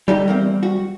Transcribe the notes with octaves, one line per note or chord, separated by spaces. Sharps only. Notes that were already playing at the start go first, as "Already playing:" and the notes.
D3 G3 D#4 G4
E2 A#3 C4
F#4